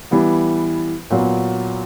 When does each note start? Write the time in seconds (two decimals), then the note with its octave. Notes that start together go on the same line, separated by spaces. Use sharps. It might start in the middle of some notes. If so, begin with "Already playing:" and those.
0.11 E3 G3 B3
1.10 A#2 F#3 B3